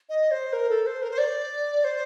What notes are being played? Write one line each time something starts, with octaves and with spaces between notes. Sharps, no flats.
D#5
C5
A#4
A4
C5
A#4
C5
D5
C5